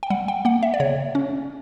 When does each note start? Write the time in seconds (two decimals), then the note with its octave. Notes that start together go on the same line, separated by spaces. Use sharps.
0.03 G5
0.10 G3 F#5
0.28 G5
0.45 A#3 F#5
0.63 E5
0.74 D5
0.80 C#3 C#5
1.15 C#4